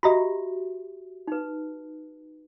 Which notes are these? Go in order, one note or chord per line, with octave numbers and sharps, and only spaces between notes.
F#4 G4 D#5 E5 A#5 B5
D#4 B4